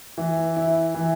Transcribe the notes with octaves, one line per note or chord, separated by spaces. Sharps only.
E3
E4
E3